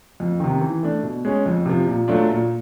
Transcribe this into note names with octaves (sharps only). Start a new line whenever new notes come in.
F2
C3 D#3
E3
A3 D4
B2
G#3 C#4
F2
C3 F3
A#2
F#3 A3 D4 F4
A#2